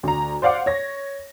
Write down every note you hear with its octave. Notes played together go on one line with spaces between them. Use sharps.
D2 A#5
C5 D5 F5 F#5 D6
C#5 A#6